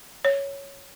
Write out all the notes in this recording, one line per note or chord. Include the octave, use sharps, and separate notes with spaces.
C#5